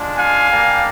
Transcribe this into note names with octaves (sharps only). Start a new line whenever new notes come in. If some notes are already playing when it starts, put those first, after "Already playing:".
Already playing: G#3 D4 F4
F5 G#5
G3 A#3 D4 G4